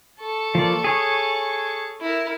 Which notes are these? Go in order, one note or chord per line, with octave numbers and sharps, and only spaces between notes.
A4 C#6
F3 A#3 D5
G#4 C#5 D#6
E4 A#4